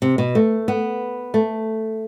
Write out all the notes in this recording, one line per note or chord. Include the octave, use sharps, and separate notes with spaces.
C3
B2
A3
B3
A3